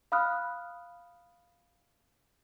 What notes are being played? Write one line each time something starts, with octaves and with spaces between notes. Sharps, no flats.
F5 B5 D#6 F6 F#6